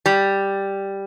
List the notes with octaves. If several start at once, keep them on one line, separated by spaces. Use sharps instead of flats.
G3